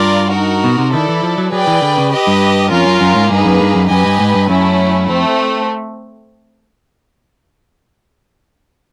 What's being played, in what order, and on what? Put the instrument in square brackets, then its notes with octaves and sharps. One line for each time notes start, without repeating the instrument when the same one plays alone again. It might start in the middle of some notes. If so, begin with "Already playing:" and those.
Already playing: [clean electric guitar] G2 [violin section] F4 A#4 D5
[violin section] D#4 F#4 A#4
[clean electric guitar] B2
C3
[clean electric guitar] D#3 [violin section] E4 A4 D5
[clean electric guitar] E3
F3
F#3
[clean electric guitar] F#3 [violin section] G#4 B4 D5 G5
[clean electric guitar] E3
D3
C#3
[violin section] G4 B4 D#5
[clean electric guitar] G2
[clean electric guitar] F2 [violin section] C#4 F4 A#4
[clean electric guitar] F#2
F#2
G#2
[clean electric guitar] G2 [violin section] A#3 D#4 G#4 B4
[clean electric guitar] F#2
G2
F#2
[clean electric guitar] F#2 [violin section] G4 B4 D#5 G#5
[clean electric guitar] G2
G#2
G2
[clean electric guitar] F#2 [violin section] A3 C#4 E4
[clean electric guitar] F2 [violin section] A3 C4